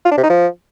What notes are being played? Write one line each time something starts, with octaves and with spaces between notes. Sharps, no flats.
F4
D4
C3
D#4
F3